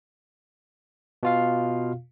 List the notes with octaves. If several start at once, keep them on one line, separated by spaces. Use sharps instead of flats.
B2 F4 F5